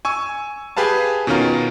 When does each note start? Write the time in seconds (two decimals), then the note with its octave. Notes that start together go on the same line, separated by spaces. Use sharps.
0.05 G#5 C#6 E6
0.77 G4 G#4 B4 F5 A5
1.27 B2 D#3 C#4 F4 A#4